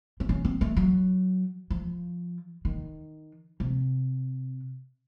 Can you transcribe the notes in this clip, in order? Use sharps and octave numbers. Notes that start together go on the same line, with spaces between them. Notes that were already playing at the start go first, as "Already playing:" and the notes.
C4
C#4
C4
A3
F#3
F3
D#3
C3